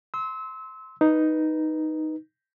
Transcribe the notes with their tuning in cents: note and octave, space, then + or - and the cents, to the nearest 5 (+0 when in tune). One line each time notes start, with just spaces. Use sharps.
C6 -5 E6 -30
D#4 +0 B4 -10